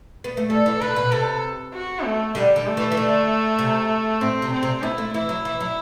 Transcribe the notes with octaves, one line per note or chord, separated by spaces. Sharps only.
B3
A3
G3 A4
E3
D3 B4
B2
C3 A4
F#4
A3
D3 G3
D3
A3
E3
E3
D3
C3
A2 C4
C3
C4
C3
B3 E4
A3
E3 E4
F#3
E3
F#3